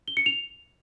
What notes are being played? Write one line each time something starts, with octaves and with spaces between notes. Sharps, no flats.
G7
C#7
F7